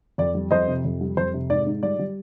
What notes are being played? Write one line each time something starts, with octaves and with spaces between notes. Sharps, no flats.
F2 D5
G3
F2 C5 D#5
C3
F2
G3
F2 C5
C3
G#2 D5
G#2
G3 D5
G3